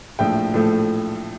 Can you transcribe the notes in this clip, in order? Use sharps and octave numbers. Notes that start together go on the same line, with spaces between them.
A#1 A2 F3 A3 G5
A#1 A2 F3 A3